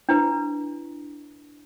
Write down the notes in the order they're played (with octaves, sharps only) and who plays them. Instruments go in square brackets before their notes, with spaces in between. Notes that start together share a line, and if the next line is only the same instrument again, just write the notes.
[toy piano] D4 E4 B4